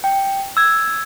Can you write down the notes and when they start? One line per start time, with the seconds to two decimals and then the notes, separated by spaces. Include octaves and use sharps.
0.04 G5
0.57 E6 G#6